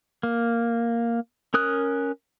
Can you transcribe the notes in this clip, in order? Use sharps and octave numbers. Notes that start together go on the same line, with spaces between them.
A#3
C#4 A#4 D#6 F#6